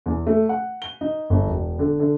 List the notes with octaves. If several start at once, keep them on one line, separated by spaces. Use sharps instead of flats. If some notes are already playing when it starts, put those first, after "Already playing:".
E2
A3
F#5
G7
D#4
G1
E1
D3
D3